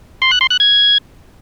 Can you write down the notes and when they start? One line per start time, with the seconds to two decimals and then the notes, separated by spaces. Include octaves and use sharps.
0.22 C6
0.31 F#6
0.41 C6
0.50 F#6
0.60 G#6